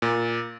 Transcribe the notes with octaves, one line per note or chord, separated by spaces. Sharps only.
A#2